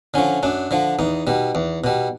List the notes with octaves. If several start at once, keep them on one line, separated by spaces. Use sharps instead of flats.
D3 F3 C#4
F#2 D4
D3 F3
E2 D#4
B2 G3
E2
B2 G3